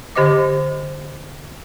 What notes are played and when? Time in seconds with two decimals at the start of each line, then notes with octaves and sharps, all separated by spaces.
0.15 D3 G4 C5 D#5 D6